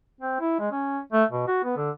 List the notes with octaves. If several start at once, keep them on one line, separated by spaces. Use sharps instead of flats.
C4
E4
G#3
C#4
A3
B2
F#4
B3
D3